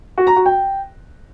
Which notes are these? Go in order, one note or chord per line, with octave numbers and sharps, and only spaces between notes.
F#4
A#5
F#4
G5